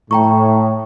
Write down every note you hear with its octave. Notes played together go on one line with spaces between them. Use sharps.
A2 G5 A#5 C#6